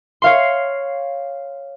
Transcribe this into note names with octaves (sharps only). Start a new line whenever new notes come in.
C#5 F5 C6